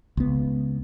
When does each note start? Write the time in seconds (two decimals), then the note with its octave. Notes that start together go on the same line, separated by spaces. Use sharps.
0.17 C#2 B3